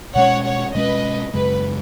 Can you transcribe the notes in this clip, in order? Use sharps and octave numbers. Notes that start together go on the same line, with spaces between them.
B2 G#3 C#4 C#5 F#5
C#5 F#5
B2 G#3 C#4 B4 D#5
F#2 C#3 G#3 B4